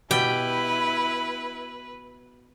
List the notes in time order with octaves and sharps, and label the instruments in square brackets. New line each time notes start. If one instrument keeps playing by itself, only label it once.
[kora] B2 G4 [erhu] E4 [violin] B4 [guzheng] G5